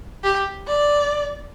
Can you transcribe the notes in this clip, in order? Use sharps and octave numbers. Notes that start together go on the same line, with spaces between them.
G4
D5